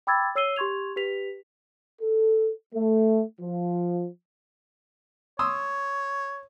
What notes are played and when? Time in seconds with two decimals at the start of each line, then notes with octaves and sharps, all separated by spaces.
0.07 G5 B5 D6 E6 G#6 A6
0.35 C#5 E6 C7 D#7 G7
0.56 G4 C6 C#6 G#6 F7
0.96 G4 B4 B6 F7
2.01 A4
2.73 A3
3.40 F3
5.39 C#5 C6 D#6 E6